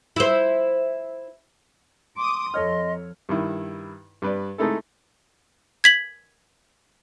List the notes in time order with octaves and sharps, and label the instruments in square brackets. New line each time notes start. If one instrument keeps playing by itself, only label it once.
[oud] E4 C5
[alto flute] C6 [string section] D6 D#6
[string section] F2 [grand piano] A4 C#5 F6 [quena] D#5
[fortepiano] G2 D#3 E4
G2 B4 D5
G#3 A3 D#4 E4 A4
[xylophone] G#6 B6 F#7